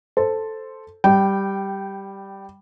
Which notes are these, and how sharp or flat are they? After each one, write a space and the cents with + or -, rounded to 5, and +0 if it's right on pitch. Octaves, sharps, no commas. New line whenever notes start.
A4 +0 C5 +0
G3 +0 G5 -15